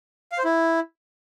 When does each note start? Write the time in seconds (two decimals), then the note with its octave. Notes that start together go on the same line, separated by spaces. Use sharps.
0.32 F5
0.38 C5
0.44 E4